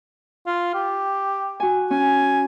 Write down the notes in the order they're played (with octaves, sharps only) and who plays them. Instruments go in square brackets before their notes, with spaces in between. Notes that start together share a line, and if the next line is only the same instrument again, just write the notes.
[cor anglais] F4
G4
[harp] F#4 G#5
[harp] C#4 [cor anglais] G#5